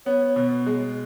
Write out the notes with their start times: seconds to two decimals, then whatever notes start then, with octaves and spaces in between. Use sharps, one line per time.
0.06 B3 C#5
0.36 B2
0.66 G#3